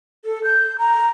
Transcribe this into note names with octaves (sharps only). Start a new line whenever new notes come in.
A4
G6
A#5